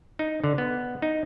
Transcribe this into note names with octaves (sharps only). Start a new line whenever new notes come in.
D#4
D3
B3
D#4